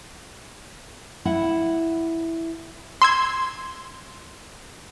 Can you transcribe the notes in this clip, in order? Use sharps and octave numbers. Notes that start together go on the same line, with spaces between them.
E4 F#5
C6 E6 G#6